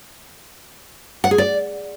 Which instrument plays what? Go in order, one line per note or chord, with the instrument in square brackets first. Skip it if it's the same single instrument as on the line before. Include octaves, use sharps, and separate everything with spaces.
[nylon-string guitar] F#5
G#4
D5